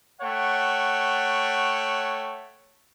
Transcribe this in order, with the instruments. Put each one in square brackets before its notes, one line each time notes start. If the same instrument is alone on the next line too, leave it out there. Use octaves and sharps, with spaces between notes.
[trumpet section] A3 C#5 F#5 G5